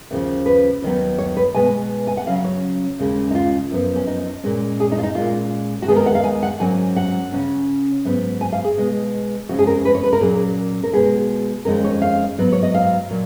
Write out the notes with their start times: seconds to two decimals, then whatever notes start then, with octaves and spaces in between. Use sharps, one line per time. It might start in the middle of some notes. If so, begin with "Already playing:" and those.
0.11 D#2 C#3 F3
0.46 B4
0.82 D#2 D#3 F#3 B3
1.18 C#5
1.37 B4
1.55 B2 G#3 B3 G#5
2.07 G#5
2.17 F#5
2.26 C#3 F#3 C#4 F5
2.44 C#5
2.99 D#2 C#3 G#3
3.31 D#4
3.35 F4
3.71 F#2 F3 B3
3.96 C#4
4.07 D#4
4.43 A#2 G#3 C#4
4.80 G#4
4.92 D#4
4.98 F4
5.03 D#4
5.15 A#2 G#3 C#4 F4
5.82 F#4
5.88 D#2 D#3 G#3 B3 G#4
5.96 A#4
6.06 F#5
6.15 F5
6.24 G#5
6.43 F#5
6.60 G#2 F#3 A#3 C#4 G#5
6.96 F#5
7.32 C#3 F#3 C#4
8.05 G#2 F#3 B3
8.41 G#5
8.52 F5
8.64 G#4
8.77 B2 G#3 B3
9.49 F2 C#3 G#3 C#4 F#4
9.59 G#4
9.67 A#4
9.85 B4
9.95 C#5
10.04 B4
10.13 A#4
10.21 A#2 F#3 A#3 C#4 G#4
10.83 A#4
10.93 B2 G#3 B3 G#4
11.65 F2 D#3 G#3 C#4 A#4
11.84 C#5
12.02 F5
12.38 G#2 F#3 B3
12.52 C#5
12.63 D#5
12.75 F5
13.10 A#2 F#3